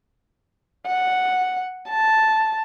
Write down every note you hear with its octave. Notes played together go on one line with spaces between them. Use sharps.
F#5
A5